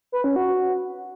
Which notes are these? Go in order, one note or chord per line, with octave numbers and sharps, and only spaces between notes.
B4
C#4
F#4